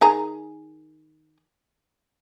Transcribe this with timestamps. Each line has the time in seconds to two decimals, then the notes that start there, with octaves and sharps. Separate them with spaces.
0.01 D#3 G#4 A#5